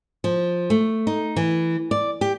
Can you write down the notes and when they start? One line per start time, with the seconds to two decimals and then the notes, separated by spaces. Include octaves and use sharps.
0.24 F3
0.70 A3
1.07 D#4
1.36 E3
1.91 D5
2.21 G4